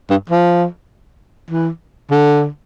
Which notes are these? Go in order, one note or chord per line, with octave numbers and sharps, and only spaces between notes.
G2
F3
E3
D3